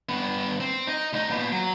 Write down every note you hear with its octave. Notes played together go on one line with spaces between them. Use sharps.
G2 B3
C4
D#4 D#5
D2 D#4
A#2 B3
F#3